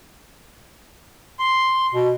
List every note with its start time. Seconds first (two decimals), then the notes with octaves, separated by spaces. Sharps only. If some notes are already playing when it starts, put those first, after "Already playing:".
1.39 C6
1.94 B2